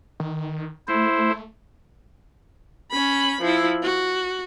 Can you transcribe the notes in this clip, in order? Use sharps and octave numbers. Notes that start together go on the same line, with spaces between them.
D#3
A3 E4 C5
C#4 B5
F3 E4
F#4